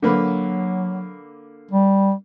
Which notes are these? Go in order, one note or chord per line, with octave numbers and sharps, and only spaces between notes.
D3 F#3 A#3 B4
G3